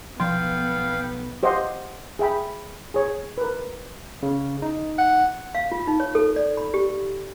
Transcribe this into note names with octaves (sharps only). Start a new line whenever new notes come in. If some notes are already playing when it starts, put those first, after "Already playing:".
B1 F3 B3 F5 G5 C6
G4 C5 D#5 F5 F#5 C6
G#4 E5 G5 B5
G#4 C#5
A#4 B4
C#3
D#4
F#5
F5
F4
D#4
C#5
A4
D5
B5
G4